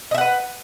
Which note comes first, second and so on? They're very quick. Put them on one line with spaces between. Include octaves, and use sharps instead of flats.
D#5 E5 F#5 B4